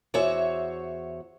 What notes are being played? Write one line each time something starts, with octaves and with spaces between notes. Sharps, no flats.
E2 F#4 C5 C#5 E5